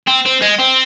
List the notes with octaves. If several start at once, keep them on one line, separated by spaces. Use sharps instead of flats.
C4
C4
G#3
C4